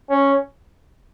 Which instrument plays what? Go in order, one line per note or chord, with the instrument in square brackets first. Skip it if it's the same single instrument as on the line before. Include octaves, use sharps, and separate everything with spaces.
[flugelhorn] C#4